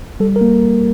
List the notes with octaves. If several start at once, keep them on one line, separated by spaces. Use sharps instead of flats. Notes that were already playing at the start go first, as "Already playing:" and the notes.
G3 A4
A#4
A#3